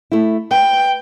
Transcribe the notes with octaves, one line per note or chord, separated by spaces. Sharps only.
A3 E4
B4 G5